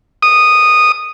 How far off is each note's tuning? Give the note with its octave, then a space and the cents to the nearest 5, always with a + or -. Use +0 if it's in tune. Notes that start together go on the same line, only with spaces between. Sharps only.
D#6 -10